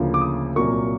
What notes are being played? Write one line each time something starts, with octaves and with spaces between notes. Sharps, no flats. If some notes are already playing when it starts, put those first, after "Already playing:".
Already playing: D2 C#3 F3 A#3
D6
D#6
C2 A#2 F#3 A#3 C#6